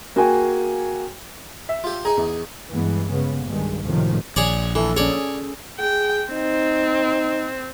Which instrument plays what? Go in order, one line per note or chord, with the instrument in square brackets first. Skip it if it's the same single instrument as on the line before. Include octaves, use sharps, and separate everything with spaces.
[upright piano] A#3 F#4 G#4 G5 G#5
E5
[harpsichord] F4 G4
[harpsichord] D#4 G#4 [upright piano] A#5
[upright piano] E2
[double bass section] G2 E3 G#3 B3
C#3 B3
B1 G2 D#3 G#3
C#2 F#2 A2 C3 D#3 F3
[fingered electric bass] A#1 [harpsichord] G#4 C#5 D5
[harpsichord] E3 [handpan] A4
[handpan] C#4 G#4 [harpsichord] C#5 D5
[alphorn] G#4 [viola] G5
[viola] C4 [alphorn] D#4